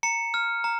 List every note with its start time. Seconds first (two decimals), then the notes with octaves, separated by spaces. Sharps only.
0.03 A#5 C#7
0.34 F6
0.64 A#5